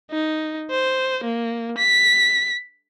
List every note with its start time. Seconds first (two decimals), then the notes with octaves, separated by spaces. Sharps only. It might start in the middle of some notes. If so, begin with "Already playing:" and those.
0.11 D#4
0.71 C5
1.24 A#3
1.78 B6